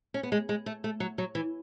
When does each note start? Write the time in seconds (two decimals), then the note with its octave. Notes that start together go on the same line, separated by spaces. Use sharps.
0.14 C#4
0.23 B3
0.32 G#3
0.49 G#3
0.66 A3
0.84 A3
1.00 F#3
1.18 F#3
1.35 E3